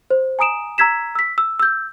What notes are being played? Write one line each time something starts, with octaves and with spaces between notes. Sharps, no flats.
C5
G#5 A#5 D#6 D7 E7
A#5 E6 G#6 B6 E7
E6 B6
E6
E6 G6